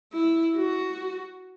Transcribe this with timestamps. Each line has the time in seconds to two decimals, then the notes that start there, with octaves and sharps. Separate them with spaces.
0.13 E4
0.56 F#4